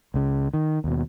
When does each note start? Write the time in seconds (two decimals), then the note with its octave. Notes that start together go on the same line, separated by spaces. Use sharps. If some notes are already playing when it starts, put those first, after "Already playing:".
0.14 C#2 C#3
0.54 D#3
0.84 D#2 B2